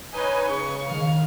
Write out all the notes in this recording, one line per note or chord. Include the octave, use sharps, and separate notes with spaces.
D#4 B4 C#5 D#5 G#5
C#3 C#6
D#3 F5